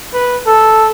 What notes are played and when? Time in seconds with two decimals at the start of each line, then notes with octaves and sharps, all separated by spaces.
0.14 B4
0.47 A4